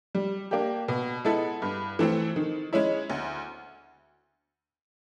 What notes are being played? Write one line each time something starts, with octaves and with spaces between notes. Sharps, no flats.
G3
A#3 D4 G4
B2
G#3 B3 E4 A4
G2
E3 A3 C4
D#3
G#3 C#4 E4
D2